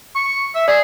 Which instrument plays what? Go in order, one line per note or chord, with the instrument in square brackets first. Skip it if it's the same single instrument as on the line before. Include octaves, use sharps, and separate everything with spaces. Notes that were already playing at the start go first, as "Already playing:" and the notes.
[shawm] C#6
E5
[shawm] G#4 [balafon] D5